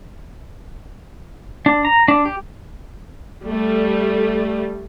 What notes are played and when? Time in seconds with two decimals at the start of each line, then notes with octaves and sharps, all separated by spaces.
1.66 D4
1.85 A#5
2.08 D4
2.25 G4
3.43 G3 A3